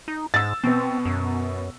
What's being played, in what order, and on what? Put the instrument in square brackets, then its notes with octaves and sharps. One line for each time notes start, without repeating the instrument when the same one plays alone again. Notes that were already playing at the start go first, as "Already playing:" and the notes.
[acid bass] D#4
[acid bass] G#2 [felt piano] E6 A6
[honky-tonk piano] B2 B3 [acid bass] C4
[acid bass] F#2